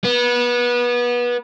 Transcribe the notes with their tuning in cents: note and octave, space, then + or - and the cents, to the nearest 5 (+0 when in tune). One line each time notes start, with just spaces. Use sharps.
B3 -25